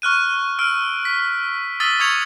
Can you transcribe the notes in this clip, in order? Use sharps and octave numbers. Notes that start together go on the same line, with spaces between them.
C#6 F6 F#6 D#7
E6 F6 D7
B6
D#6 E6 A6 B6 D#7 G7
C#6 D#6 G#6 C#7 F7 F#7